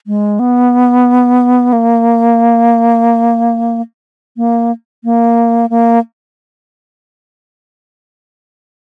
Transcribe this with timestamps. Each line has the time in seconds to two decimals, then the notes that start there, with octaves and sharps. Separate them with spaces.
0.07 G#3
0.39 B3
1.73 A#3
4.37 A#3
5.04 A#3
5.70 A#3